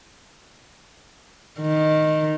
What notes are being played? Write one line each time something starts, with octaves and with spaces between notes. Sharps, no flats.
D#3